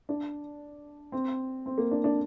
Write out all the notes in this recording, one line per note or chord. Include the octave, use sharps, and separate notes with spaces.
D4
C4
C4
A#3
D4
D4